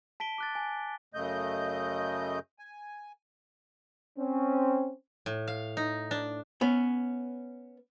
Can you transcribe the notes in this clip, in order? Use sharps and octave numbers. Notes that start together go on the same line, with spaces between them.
A5 B6 D7 G7
D6 F#6 A6
G#5
F#2 C#3 A3 D#5 G6
G#5
C4 C#4
A2
F5
D#4
D4
B3 C#4